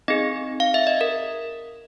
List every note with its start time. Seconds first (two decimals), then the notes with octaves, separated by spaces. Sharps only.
0.08 C4 D#4 G#4 D#5
0.60 F5
0.74 E5
0.87 D#5
1.01 A#4